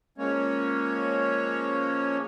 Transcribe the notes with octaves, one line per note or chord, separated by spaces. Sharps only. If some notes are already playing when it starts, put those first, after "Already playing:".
F3 G#3 A#3 C#4 C#5